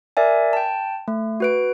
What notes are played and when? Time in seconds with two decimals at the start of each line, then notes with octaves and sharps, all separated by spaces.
0.17 A#4 D5 E5 G#5
0.53 G5 A5
1.08 A3
1.40 F#4 B4 D7